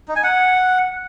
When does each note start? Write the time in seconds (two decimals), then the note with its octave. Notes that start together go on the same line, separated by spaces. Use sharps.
0.08 D#4
0.16 G#5
0.23 F#5